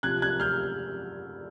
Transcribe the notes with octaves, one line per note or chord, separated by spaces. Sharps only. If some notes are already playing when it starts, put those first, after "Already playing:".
C3 F3 F#6 G#6
F#6 G#6
F6 G6